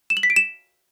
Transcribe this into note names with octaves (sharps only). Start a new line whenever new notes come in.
E7
F#7
B6
D7
E7